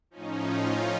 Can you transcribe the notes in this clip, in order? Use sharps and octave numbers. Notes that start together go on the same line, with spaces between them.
A2 F3 C#4 D#4
D#4 F4